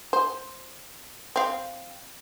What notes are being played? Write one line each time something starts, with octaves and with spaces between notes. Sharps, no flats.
C5
C4 F5